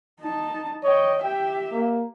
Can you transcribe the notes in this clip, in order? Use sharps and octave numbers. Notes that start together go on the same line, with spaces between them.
D#4 A5
C#5 D#5 G5
G4 E5 G5
A#3